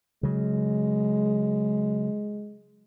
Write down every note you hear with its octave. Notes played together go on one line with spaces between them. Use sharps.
C#3 F#3 G#3